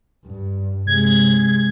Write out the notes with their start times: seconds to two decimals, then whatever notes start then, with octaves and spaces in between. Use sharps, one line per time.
0.25 G2
0.87 C3 G#3 G#6